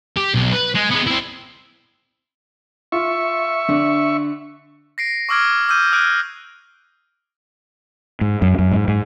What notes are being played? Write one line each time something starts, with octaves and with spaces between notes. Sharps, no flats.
G4
B1
B4
G#3
G#3 B3
C4 E4
F4 E5 C#6
D3
A#6 C7 D7
C#6 D6 E6 F6 G#6 D7
D6 E6 F6 G6 D#7
D#6 F6 F#6 G#6 D7 D#7
G#2
F#2
F#2
G#2
G#2